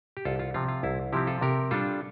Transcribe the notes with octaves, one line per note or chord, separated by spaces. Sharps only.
G4
C2 F4 A4
F4
C3 F3 C4 F4
F4
C2 E4
C3 F3 C4 E4 G4
F4 A4
C3 G4 A#4
G3 D4 F4 A4